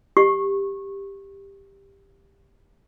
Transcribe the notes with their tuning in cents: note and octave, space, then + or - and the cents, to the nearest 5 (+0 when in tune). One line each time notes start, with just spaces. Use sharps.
G4 +10 C#6 -20